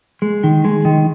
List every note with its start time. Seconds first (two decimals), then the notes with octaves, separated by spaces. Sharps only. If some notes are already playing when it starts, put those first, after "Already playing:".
0.22 G#3
0.44 D#3
0.65 G#3
0.85 D#3